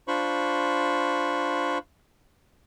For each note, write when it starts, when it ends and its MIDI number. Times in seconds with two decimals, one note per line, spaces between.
0.08 1.78 62
0.08 1.78 65
0.08 1.78 72
0.08 1.78 83
0.08 1.78 85